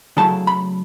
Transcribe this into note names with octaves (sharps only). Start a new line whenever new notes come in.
C#3 F#3 A3 E4 A5
B5